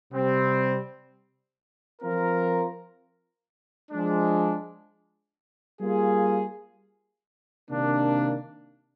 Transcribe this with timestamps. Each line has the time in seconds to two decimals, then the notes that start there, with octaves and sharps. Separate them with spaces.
0.12 C3 G3 C4
2.02 F3 C4 F4 A#4
3.92 F3 G#3 D4
5.80 G3 A#3 F4 G#4
7.70 C3 D#3 A#3 D4